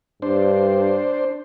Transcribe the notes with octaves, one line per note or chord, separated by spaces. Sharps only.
G2 D4 C5